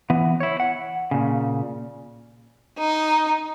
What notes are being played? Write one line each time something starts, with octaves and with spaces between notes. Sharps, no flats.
E3 B3
E4 C#5
F#5
A#2 C#3
D#4